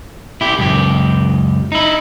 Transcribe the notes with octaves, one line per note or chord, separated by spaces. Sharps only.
E4 G4
C#2 F#2 G4
D#4 E4